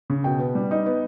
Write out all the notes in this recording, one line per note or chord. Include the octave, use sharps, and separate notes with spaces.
C#3
B2 G5
B3
G3
D#4
B3